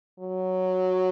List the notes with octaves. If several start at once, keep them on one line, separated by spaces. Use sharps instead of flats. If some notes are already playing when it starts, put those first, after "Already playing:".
F#3